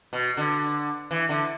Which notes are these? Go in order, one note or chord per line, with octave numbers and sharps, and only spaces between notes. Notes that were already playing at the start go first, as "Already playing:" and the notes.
B2
D3
E3
D3